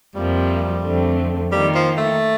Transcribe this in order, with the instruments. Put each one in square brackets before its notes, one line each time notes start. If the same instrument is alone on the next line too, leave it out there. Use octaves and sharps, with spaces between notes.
[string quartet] F2 C3 F3 A#3 [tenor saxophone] G3
[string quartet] F2 D3 A3 C4
[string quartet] D#3 A#3 F4 [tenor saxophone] G3
[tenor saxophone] F3
A3